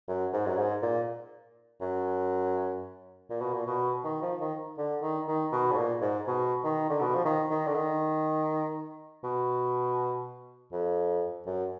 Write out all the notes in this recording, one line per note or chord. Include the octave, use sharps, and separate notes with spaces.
F#2
G#2
F#2
G#2
A#2
F#2
A#2
B2
A#2
B2
D#3
F3
D#3
D3
D#3
D#3
B2
G#2
A#2
G#2
B2
D#3
D3
B2
F3
D#3
D#3
D3
D#3
B2
F2
F#2